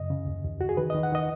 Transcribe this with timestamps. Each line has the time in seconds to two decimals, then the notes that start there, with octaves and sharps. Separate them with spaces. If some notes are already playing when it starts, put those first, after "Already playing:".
Already playing: F#2 C#3 D#5
0.10 C#3
0.27 D#2
0.44 D#2
0.61 D#2 F#4
0.69 G#4
0.77 D#3 B4
0.90 D#3 D#5
1.03 F#5
1.12 D#3 D#5